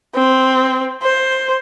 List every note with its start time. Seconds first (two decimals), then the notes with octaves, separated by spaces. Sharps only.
0.15 C4
1.03 C5